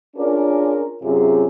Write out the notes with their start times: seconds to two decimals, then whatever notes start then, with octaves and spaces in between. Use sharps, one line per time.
0.16 C#4 D4 F4 G#4 A#4
1.02 F#2 C3 C#4 F4 G#4